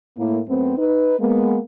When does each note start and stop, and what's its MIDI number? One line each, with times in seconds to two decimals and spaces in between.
0.18 0.40 45
0.18 0.40 58
0.48 0.74 42
0.48 0.74 57
0.48 0.74 59
0.48 0.74 60
0.77 1.17 63
0.77 1.17 71
1.19 1.59 56
1.19 1.59 58
1.19 1.59 59